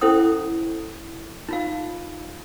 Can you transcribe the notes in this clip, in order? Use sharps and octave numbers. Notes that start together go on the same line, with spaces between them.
C#4 E4 A4 C5 F#5 D#6
D#4 F4 F5